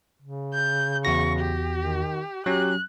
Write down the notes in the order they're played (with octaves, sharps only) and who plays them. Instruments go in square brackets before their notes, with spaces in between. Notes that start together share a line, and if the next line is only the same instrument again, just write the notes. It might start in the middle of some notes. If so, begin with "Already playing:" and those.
[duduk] C#3
[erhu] G6
[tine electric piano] E2 F#4 A#6 [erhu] C#6
[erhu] G4
[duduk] D#3
[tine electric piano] F#3 C#4 [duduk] G4 [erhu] F#6